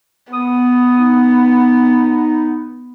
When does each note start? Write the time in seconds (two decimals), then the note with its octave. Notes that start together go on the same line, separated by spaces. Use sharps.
0.33 B3 D#6
0.98 D#4